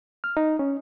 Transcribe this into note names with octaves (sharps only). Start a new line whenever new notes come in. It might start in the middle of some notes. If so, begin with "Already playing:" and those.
F6
D#4
C#4